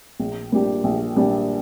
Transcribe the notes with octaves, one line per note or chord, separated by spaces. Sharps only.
A#1
A#2 G3 D4 G4
A#1
A#2 G3 D4 G4